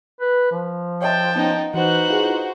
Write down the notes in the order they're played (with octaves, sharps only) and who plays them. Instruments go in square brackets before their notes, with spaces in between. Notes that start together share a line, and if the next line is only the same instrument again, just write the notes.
[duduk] B4
F3
[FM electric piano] C#5 D#5 E5 [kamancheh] G5 A5
[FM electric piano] B3 C#4 F#5 [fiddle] D#4
[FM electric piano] E3 [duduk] D#4 [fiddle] F#4 C5 [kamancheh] B4 F#6
[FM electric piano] E4 F4 G#4